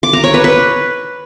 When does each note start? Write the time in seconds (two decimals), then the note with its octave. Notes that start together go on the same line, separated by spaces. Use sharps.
0.03 D6
0.13 A#5
0.24 C#5
0.34 B4
0.44 B4